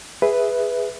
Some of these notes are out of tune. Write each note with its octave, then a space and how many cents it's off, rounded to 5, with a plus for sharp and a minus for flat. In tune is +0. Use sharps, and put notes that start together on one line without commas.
G#4 -10 B4 +0 E5 +0